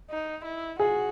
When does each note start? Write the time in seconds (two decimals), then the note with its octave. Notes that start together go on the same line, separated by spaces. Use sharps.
0.10 D#4
0.45 E4
0.79 F#4 G#4